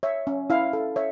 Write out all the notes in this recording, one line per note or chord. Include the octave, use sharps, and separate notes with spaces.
C#5 E5
C#4
E4 F5
A4
C#5 E5